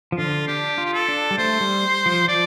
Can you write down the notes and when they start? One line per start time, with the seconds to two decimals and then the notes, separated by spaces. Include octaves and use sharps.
0.12 F3
0.18 D3 F4
0.48 D4 G4
0.78 F4
0.85 G4
0.93 A4
1.08 D4
1.31 G3
1.38 A3 C5
1.61 G3
2.06 F3
2.28 F3 D5